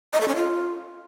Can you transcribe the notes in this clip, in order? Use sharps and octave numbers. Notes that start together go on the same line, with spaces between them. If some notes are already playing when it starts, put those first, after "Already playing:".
D#5
A4
C#4
F4